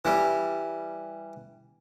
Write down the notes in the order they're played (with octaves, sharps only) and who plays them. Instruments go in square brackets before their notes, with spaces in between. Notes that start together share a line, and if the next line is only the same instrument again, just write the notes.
[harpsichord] E3 G3